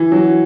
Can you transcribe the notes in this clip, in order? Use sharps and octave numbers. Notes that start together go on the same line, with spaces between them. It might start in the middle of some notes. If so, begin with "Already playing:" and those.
Already playing: E3
F#3